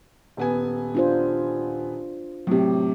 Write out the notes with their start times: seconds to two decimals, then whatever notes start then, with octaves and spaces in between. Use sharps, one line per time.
0.37 D#1 B3 G#5
0.95 D4 F4 C5
2.47 A2 C3 F#3 G4